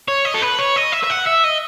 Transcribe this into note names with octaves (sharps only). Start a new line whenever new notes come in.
C#5
D#5
A4
B4
C#5
D#5
E5
E5
F#5
E5
D#5